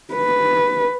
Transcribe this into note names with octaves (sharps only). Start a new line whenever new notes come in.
B4